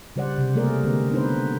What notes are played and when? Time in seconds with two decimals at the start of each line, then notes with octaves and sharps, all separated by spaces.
0.16 C#3 G3 C5 D5 F#5
0.38 C3
0.55 G3 A3 A#3 G#4 A#4 D5
0.84 D3 G#3 A#3 C4
1.11 B3 D4 D#4 B4 C5